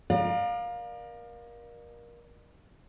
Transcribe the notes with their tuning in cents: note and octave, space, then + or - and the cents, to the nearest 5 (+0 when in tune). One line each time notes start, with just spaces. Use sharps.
A#4 +25 D5 +45 F5 +20